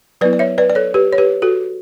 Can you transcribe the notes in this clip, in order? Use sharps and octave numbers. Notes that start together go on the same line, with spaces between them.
F#3 B3 E4 B4 D5
D5
C#5 E5
B4 D5
D5
A4 C#5
G4 B4
C#5
G4 B4
F#4 A4